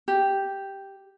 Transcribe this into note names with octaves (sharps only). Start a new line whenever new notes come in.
G4